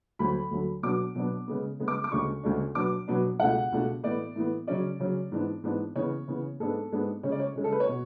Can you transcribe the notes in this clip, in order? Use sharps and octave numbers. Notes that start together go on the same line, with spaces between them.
D2 D3 F#3 B5
D2 D3 F#3
B2 F#3 B3 D4 D6
B2 F#3 B3 D4
C#3 G#3 B3
C#3 G#3 B3
D6
D6
D2 C#3 G#3 D4 C#6
D2 C#3 G#3 D4
B2 F#3 B3 D4 D6
B2 F#3 B3 D4
C#2 B2 A3 D4 F#5
C#2 B2 A3 D4
A2 E3 B3 D5
A2 E3 B3
C#3 F#3 C#4 D5
C#3 F#3 C#4
G#2 E3 B3 D4
G#2 E3 B3 D4
C#3 E3 B3 C#5
C#3 E3 B3
G#2 G#3 B3 D4 A4
G#2 G#3 B3 D4
C#3 G#3 C#4 C#5
D5
C#5
C#3 G#3 C#4
A4
B4
C#5
B2